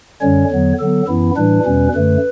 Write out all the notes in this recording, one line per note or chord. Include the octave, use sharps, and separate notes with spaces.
F#2 D3 G3 C#4 C#5
E2 D3 F#3 B3
D3 F#3 B3 A4
F#2 E3 B3 E4
A2 E3 G3 D4 B4
E2 B2 G3 C#4
F#2 D3 A3 B4